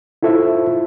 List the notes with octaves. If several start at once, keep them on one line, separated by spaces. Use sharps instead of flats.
E4 F4 A4 C5 E5